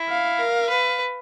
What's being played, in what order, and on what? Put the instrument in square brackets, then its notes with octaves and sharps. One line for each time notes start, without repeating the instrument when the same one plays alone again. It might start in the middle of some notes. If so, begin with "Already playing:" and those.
Already playing: [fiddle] E4
[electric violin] F5
[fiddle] A#4
B4